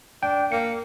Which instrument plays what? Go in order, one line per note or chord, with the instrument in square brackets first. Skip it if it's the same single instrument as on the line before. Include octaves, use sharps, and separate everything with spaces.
[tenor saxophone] D4 [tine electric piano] G5
[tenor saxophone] A#3 [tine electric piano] C#7